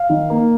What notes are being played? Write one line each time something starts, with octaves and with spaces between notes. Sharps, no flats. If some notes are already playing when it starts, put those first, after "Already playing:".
Already playing: F5
D#3
A#3